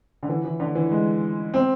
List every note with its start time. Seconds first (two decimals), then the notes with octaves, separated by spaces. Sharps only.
0.23 D3
0.29 E3
0.45 E3
0.60 D3
0.75 E3
0.91 G#3
1.54 C4